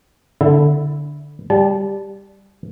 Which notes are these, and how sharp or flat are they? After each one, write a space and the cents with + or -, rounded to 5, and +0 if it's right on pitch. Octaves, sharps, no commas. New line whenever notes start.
D3 +0 E4 +0
G3 +5 A5 -25